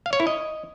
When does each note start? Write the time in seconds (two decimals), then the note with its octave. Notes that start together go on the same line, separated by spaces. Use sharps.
0.06 F5
0.13 C#5
0.20 E4
0.27 D#5